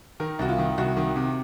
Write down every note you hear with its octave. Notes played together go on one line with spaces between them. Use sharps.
D#3 A#4
C2 F#4
F4
D#3
C2 F#4
D#3
C3